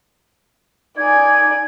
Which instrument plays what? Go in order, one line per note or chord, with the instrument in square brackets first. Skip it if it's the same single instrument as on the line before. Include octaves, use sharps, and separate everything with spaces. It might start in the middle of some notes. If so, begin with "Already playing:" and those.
[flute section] D#4 G#6 [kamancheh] D5 G#5